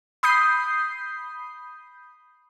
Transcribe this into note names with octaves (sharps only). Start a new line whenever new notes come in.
B5 D#6 G6 C7